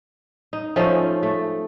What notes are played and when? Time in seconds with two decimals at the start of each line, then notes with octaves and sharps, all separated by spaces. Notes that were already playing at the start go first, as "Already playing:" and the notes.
0.53 D#4
0.76 F3 A3 C#4 D#4
1.23 A3